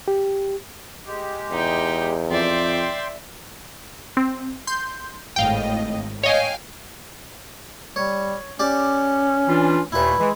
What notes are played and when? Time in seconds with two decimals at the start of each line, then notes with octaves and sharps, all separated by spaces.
0.08 G4
1.06 G#3 G4
1.51 E2 D#4 G5
2.31 F2 D5 E5 G5 C6
4.17 C4
4.67 C6 G6
5.36 G#1 A2 D#5 F5 G5
6.23 C#5 D#5 F5 G5 G#5
7.96 G3 C#5
8.60 C#4 G4 D5
9.48 E3 D4 F4
9.92 D#2 A#2 A3 E4 B4
10.20 E3 G#3